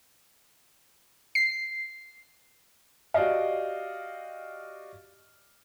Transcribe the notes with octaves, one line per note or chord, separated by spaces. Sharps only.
C7
F#4 G4 D5 D#5 F5